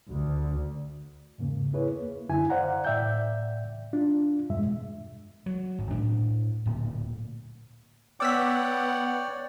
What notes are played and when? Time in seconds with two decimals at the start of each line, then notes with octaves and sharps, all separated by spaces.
0.11 D2
1.38 E2 G#2 C#3 A#3
1.73 A#3 E4 G#4 B4 C#5
1.89 A#3
2.29 F#2 D3 E4 G#5
2.50 C5 D5 F5 F#5 A#5
2.85 A2 D5 E5 G5 G6
3.93 D4 F4
4.50 E2 G2 B2 G#3 E5
5.46 F#3
5.78 G#1
5.91 A2 D4
6.66 D1 A#2
8.20 B3 C#5 D5 F#5 G5 D6 E6 B6